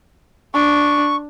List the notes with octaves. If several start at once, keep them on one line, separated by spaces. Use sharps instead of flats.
D4 C#6